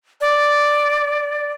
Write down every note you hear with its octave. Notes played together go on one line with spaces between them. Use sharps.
D5